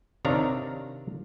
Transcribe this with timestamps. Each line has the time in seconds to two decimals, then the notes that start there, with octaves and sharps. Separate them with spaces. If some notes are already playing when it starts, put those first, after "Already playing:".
0.25 C3 D#3 D4 C#5 F5 A#5